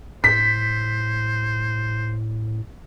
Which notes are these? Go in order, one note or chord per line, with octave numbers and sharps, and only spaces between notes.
A2 C5 B6